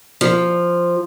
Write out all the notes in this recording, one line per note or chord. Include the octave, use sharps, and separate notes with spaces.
F3